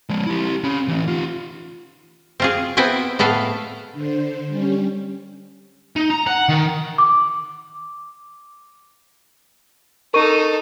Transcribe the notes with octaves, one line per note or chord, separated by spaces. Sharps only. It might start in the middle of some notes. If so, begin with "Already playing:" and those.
F3 G#3
E4 G4
C#4 B5
A2 E3
F4 G4
C4 F4 G#4
B3 C4 E4 G5 G#5
A2 B3 G#4 A4 F5
D3 C5
G3 C#4
D#4
A#5
F#5
D#3
D6
D#4 A4 A#4 C#6 D#7